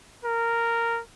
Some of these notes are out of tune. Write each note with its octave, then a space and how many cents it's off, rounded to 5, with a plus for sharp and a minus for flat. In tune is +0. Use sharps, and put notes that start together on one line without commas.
A#4 -10